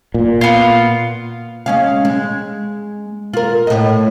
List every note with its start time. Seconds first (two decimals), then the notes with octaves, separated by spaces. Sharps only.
0.14 A#2
0.41 B3 F4
1.66 G#3 C#4 F5
2.05 G#3
3.34 F4 A#4
3.67 A2 D#5